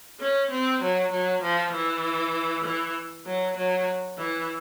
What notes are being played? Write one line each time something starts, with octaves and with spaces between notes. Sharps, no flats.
C#4
C4
F#3
F#3
F3
E3
E3
F#3
F#3
E3